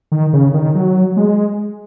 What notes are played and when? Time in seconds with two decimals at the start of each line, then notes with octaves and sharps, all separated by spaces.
0.12 D#3
0.33 C#3
0.54 D#3
0.75 F#3
1.17 G#3